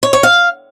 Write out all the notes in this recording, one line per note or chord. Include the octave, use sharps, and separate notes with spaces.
C#5
C#5
F5